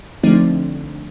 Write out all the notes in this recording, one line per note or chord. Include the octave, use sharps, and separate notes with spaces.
D3 F3 A3 C4 D4 D#4